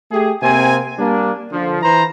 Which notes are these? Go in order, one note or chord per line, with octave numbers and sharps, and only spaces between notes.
A3 G4 G#4
C3 A#3 C4 G#5
G3 A#3 D4
D3 F3
E3 B4 C5 A#5